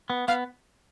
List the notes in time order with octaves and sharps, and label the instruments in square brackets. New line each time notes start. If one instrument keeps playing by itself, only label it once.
[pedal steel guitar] B3
[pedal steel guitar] B3 [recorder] F5